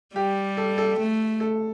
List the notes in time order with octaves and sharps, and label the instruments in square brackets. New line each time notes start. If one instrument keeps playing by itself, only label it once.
[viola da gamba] G3 [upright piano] G4
[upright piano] A4
A4
[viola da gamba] A3
[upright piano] A4